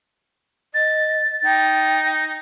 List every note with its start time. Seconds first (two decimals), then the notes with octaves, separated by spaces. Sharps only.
0.74 D#5 A6
1.45 D#4 G5